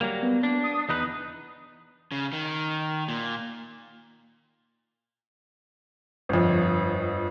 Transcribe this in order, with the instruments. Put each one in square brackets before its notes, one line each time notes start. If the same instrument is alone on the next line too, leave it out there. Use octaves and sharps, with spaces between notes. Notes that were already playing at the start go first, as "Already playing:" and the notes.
[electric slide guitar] F#3 G3 A#3
[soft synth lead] B3
[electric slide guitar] D4
[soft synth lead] D#6
[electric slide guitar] E2 D#4 B4 [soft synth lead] D#6
[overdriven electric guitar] C#3
D#3
A#2
[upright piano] G1 F2